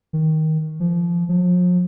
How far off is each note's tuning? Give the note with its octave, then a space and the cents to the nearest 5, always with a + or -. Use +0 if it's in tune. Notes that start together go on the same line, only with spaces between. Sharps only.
D#3 +15
F3 -20
F3 +40